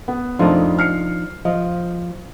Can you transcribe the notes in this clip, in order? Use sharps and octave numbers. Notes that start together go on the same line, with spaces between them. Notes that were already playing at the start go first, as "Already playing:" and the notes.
B3
F2 F3 A3 D4 D#4 C6
F6 C7 C#7
F3 D#5